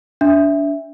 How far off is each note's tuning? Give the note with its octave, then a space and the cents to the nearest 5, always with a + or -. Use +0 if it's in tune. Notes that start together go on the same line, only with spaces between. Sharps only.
D4 -25 E5 +0